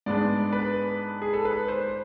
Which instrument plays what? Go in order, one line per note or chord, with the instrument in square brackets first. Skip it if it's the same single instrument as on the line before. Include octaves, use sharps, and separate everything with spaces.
[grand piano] G#2 G#3 B3 D4 D5
B4
G#4
A4
B4
C5